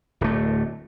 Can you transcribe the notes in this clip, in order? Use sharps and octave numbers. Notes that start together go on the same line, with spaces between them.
D1 A3